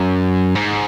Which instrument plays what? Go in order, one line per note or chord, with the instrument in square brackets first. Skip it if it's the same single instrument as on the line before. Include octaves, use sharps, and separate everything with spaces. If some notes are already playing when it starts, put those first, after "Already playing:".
Already playing: [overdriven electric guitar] F#2
G#2